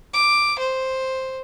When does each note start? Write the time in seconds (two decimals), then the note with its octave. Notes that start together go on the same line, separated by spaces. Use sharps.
0.13 D6
0.59 C5